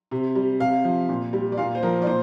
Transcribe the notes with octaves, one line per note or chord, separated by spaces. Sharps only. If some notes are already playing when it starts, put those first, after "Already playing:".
C3
G3
C3 F5
F3
A#2
G3
D5
A#2 F5
C5
F3 A#4
D5
A#2 C5